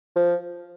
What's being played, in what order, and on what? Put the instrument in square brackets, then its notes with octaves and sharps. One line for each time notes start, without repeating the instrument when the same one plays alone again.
[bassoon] F3